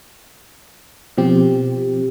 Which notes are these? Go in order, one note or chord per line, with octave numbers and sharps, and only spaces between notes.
B2 F3 C4 G4